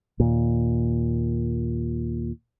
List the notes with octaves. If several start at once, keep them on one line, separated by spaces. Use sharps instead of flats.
D#2 A#2